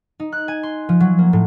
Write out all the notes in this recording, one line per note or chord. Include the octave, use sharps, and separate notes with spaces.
D#4
F#6
G#5
C6
F3
F#3
A#3
A2